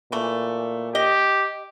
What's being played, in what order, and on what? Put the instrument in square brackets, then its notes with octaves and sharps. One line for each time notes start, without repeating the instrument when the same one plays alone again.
[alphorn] A#2 [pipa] E3 A3
[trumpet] G4 [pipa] D#5